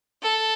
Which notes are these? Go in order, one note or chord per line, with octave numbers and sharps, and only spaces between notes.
A4